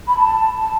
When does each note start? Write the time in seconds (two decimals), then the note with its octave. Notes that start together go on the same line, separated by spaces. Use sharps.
0.08 B5
0.18 A5
0.57 A5